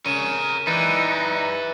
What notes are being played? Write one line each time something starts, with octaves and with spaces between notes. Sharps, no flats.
C#3 A#4 C#5 D#7 E7
E3 D#4 B4 D5 F#6 A6